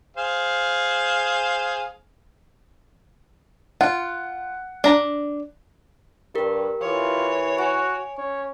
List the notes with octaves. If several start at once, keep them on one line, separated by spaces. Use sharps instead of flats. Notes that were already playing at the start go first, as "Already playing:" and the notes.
G#4 C5 F5
F4 F#5
D4 A#5
G2 G4 A#4
E3 F4 C#5
F#4 G#5
C#4 C#5